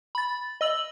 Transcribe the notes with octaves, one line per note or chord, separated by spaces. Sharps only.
B5 A6
D#5 E6 F#7